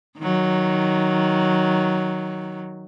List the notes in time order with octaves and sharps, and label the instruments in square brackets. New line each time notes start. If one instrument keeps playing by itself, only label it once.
[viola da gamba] D#3 F#3